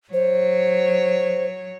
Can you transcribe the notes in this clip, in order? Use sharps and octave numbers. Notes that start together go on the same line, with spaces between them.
F#3 C5 C#5